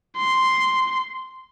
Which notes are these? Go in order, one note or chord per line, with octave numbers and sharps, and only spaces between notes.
C6